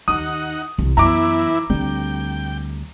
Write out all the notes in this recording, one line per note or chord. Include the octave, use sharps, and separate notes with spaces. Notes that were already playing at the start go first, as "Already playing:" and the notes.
D#2 D#4 F#5 D#6
C2
F#2 E3 B3 E4 A#5 D6
D2 D3 G3 C4 G5